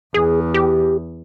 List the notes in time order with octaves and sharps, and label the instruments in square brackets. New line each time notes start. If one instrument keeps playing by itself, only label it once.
[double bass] E2 [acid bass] G#4
[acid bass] G4